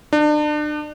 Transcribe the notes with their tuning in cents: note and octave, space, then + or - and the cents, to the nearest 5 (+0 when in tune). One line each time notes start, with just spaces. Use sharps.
D4 +35